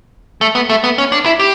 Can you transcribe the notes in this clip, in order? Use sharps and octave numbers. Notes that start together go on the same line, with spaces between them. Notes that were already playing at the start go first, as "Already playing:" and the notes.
A3
B3
A3
B3
C#4
D4
E4
G4